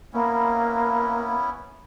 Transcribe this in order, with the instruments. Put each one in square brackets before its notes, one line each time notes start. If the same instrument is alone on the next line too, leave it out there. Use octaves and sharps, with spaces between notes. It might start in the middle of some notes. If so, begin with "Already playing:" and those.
[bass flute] A#3 [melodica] B3 C#4 E4